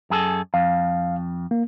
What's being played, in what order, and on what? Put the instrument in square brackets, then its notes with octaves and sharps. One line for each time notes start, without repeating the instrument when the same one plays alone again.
[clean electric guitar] F#2 G#4 A4
[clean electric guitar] F2 [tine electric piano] F5
[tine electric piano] A#3